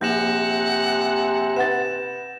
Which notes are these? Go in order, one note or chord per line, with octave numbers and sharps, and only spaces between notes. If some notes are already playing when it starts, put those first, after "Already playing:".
A#1 C3 F#5 G6 A#6 E7
B4 F#5 A6 E7